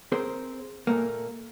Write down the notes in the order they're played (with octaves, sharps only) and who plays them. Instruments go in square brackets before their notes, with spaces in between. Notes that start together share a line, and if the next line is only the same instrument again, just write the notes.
[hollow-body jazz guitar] C4 G#4 A#4 C5
A#2 A3 A#3